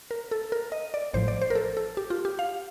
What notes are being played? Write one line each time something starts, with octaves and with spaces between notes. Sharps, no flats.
A#4
A4
A#4
D#5
D5
A1 A2 F3 C5
D5
C5
A#4
A4
A4
G4
F4
G4
F5